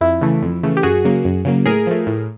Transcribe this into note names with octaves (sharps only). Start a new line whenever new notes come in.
F2 E4
C#3 E3 A3
F2
C#3 E3 A3
G4
F#2 F#4 G#4
C#3 F#3 A#3
F#2
C#3 F#3 A#3
A2 G#4 A#4
F3 A3
A2